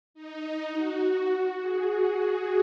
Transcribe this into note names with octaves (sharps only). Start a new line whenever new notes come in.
D#4
F#4
G#4